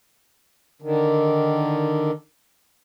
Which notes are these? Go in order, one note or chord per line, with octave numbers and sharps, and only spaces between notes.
D3 D#3